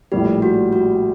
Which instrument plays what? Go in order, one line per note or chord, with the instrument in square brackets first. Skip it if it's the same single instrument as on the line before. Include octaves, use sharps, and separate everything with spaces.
[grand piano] A#1 A2 G3 [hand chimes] G4
[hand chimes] F#4
F#4